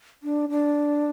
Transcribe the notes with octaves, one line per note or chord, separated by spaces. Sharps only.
D4
D4